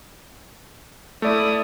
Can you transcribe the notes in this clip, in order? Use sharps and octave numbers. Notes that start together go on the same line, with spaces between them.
A3 E4 D5 D#6